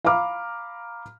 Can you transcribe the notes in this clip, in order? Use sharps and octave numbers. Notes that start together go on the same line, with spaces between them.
F5 A#5 B5 D6 F6